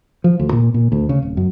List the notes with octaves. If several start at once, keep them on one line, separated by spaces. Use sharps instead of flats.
F3
D2
A#2
A#2
D2
C#3
D1
F#2